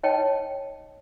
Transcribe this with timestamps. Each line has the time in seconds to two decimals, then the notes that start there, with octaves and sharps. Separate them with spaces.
0.03 D#4 C#5 D#5 G5 A5